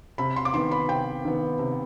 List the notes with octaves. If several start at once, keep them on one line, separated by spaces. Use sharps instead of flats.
C3 B5
C6
D6
D#3 B3 C6
B5
C3 G5
D#3 B3
C3